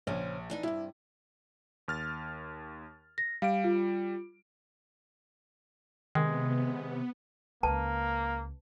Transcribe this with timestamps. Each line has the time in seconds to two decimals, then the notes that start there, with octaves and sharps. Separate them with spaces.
0.07 A#1 C#3 C#4 C5
0.50 E3 D4 D#4
0.63 G2 C3 E4
1.88 D#2 F6 A6
3.18 A#6
3.42 G3 F5 D7
3.64 F4
6.15 C3 D#3 G#3 B3
7.63 C#2 C#3 A#3 B4 A5